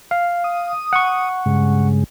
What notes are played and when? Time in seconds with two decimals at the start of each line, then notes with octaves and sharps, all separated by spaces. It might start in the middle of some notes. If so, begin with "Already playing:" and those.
0.11 F5
0.44 D#6
0.93 F#5 C#6
1.46 G2 C#3 G#3